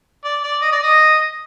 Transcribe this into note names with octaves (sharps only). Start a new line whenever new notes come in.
D5
D5
D#5
D5
D#5